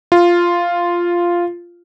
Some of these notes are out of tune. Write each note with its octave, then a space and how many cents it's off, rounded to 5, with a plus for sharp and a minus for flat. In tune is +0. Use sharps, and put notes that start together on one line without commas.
F4 -5